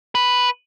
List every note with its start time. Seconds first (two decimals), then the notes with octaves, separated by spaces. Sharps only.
0.15 B4